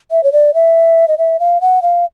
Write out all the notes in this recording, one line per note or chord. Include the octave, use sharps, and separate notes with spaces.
E5
C#5
D5
E5
D#5
E5
F5
F#5
F5